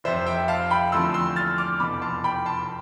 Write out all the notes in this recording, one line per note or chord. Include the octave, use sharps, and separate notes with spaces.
F1 F2 C3 C5 E5
E5 G5
F5 A5
G5 B5
E2 D3 F3 A3 C4 C6 E6
C6 E6
F6 A6
D6 F6
F1 E2 B2 B5 D6
A5 C6
G5 B5
A5 C6